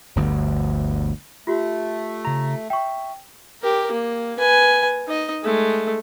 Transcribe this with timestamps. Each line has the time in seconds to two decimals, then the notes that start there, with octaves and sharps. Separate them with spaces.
0.16 G1 D2
1.47 A3 F4 G4
2.25 C#3 A#5
2.70 E5 G5 C#6
3.62 G4 A#4
3.92 A#3
4.38 B4 G#5
5.08 D#4 D#5
5.44 G#3 A3